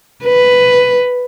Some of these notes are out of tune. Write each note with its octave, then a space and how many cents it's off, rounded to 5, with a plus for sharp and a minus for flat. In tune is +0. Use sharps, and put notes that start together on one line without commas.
B4 +5